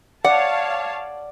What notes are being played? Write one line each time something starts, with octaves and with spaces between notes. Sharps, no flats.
C#5 D5 F5 F#5 A5